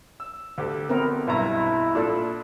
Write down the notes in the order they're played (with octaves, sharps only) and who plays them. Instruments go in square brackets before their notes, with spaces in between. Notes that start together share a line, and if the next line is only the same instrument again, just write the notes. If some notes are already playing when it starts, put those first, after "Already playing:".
[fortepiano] E6
D2 G4 A4
[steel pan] B3 C4 A#4
[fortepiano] B1 G2 A#5 [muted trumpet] E4
[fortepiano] A#2 D4 [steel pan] F4 A4